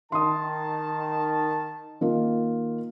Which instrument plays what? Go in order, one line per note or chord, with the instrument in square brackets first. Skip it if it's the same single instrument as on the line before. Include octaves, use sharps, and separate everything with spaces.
[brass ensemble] D#3 A5 [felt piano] C6 D#6
[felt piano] D#3 A#3 F4